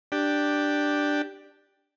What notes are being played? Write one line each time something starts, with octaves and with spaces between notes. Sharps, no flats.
D4 G4